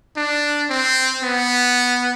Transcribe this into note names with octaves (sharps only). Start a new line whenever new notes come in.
D4
C4
B3